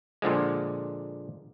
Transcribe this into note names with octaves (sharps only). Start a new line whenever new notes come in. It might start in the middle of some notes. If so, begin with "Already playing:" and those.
A#2 D3 F3 G#3